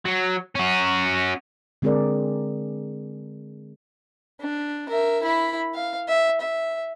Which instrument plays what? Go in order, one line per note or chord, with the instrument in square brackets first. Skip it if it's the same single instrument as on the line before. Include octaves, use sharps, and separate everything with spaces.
[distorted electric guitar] F#3
C#4 F#4
[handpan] D3 G#3 C4 G#4 A#4 D5
[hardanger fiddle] D4
A#4 E5
E4 B5
F5
E5
E5